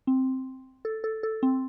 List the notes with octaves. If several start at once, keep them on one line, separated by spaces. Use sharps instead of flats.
C4
A4
A4
A4
C4